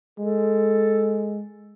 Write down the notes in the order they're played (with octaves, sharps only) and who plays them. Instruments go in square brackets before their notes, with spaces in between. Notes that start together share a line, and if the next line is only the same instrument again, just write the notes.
[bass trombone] G#3 [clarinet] A4